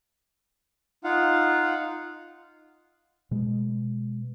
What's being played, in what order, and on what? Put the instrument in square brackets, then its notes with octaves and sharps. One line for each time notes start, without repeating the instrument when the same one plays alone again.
[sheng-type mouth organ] D#4 F4 F5 F#5
[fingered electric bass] B2 G#3